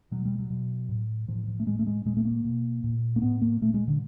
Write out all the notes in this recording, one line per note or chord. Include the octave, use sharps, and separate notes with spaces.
B2 F#3
G3
F#3
B2
A2
A2 F3
F3
A3
A2 G#3
A3
G#3
A#2 G#3
A3
A#3
B2
A#2
A#3
A2 B3
A#3
A#2 A3
G#3
D3